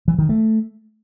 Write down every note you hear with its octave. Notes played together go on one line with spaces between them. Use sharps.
E3
D#3
A3